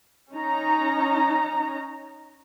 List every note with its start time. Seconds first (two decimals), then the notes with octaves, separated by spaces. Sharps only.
0.32 C#4 D#4 A#5